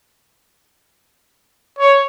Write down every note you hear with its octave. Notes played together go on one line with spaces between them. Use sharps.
C#5